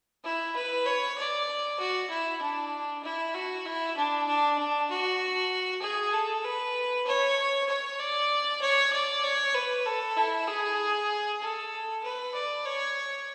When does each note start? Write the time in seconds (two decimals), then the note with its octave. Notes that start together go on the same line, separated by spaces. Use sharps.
0.24 E4
0.55 B4
0.86 C#5
1.17 D5
1.79 F#4
2.10 E4
2.42 D4
3.04 E4
3.34 F#4
3.66 E4
3.97 D4
4.27 D4
4.58 D4
4.90 F#4
5.82 G#4
6.13 A4
6.44 B4
7.07 C#5
7.69 C#5
8.00 D5
8.61 C#5
8.93 D5
9.23 C#5
9.55 B4
9.86 A4
10.17 E4
10.47 G#4
11.42 A4
12.03 B4
12.34 D5
12.65 C#5